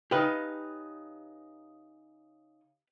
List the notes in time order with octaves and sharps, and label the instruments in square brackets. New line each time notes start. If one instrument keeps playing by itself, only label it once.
[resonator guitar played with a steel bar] C#3 D#4 [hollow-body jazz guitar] G4 B4